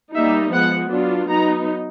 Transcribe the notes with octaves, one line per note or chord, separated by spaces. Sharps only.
G3 A#3 D#4 E5
F3 G#3 B3 F#5
F#3 B3 D4 F4
F#3 B3 D#4 A#5